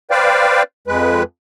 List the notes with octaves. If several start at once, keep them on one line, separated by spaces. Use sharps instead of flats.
B4 C5 D5 F5 G5
F2 G#3 B4